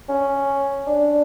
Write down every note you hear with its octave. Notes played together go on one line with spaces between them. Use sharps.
C#4
D4